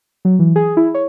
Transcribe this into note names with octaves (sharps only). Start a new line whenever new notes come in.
F#3
E3
G#4
E4
C#5